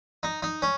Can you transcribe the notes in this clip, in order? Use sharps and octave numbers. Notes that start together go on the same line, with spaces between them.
D#4
D#4
C#4